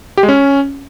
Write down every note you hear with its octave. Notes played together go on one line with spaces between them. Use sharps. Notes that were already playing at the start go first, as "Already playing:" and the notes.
G4
G#3
C#4